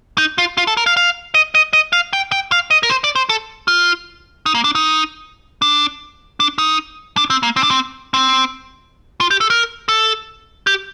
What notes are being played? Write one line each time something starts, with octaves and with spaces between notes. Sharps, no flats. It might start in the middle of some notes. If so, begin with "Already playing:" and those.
D#4
F4
F4
A4
A#4
F5
F5
D#5
D#5
D#5
F5
G5
G5
F5
D#5
A#4
C5
D5
C5
A4
F4
D#4
A#3
D4
D#4
D4
D4
D#4
D4
C4
A#3
C4
D4
C4
C4
F4
G4
A4
A#4
A4
G4